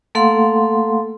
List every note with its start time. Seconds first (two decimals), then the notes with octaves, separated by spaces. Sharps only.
0.15 A3 A#3 A4 F5 F#5 C6